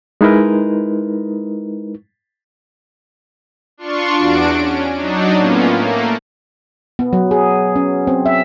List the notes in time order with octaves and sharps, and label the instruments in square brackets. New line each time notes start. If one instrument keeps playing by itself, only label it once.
[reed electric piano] G#3 D#4 E4 A#4 B4
[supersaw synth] D4 F4 C6 C#6
E2 D4 F#4 D7
C#4
F#3 D4 D#4
A2 A#3 B3 C#4 F4
A3 A#3
[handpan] B3
F#3
G#4
C#4
C4
E5